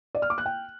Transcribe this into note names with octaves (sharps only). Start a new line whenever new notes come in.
D5
F6
D6
F#6
G5